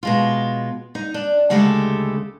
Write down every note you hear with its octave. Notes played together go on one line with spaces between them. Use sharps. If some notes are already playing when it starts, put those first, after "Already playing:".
B2 G#3 F4
D#4
D4
D2 C#3 G#3 A3 G4 A4